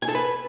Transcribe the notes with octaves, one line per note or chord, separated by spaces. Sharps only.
G#5
A4
B4